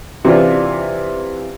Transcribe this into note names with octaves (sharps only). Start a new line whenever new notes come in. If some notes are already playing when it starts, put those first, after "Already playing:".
C3 E3 D4 F4